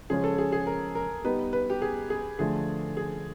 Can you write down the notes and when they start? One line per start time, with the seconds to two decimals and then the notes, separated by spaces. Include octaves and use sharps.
0.10 C#3 F3 G#3 C#4 G#4
0.24 A4
0.38 G#4
0.52 G#4
0.67 A#4
0.95 A#4
1.24 G3 B3 D#4 B4
1.53 B4
1.70 G4
1.82 G#4
2.10 G#4
2.39 D3 F3 A3 G#4
2.97 G#4